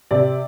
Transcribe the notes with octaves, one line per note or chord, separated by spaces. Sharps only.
C3 D5